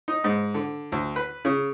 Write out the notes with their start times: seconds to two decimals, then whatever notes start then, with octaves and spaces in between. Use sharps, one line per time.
0.08 D#4
0.24 G#2
0.54 D3
0.92 D2
1.16 B4
1.45 C#3